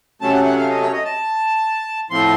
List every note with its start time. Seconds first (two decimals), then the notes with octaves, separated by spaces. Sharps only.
0.21 C3 F#3 A3 C#4 A5
0.34 F#5
0.45 F#5
0.58 F5
0.69 D#5
0.81 C#5
0.93 D#5
1.05 A5
2.10 A2 F3 C4 C6